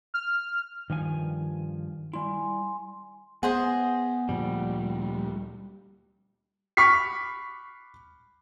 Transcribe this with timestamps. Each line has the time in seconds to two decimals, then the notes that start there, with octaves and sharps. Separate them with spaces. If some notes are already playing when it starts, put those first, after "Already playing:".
0.14 F6
0.90 G2 D#3 F3 G#5
2.14 G3 E4 G#5 C6
3.43 B3 G#4 C5 D#5 F#5
4.29 D2 A#2 F3 G3
6.77 B5 C#6 D6 F6 B6 C7